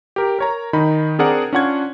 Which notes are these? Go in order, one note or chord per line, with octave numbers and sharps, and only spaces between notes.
G4 A#4
A#4 C#5 A#5
D#3 D#4 B5
C4 D4 G#4 A#4 D5 F#5
C#4 D4 F4 F#5 C#6 G#6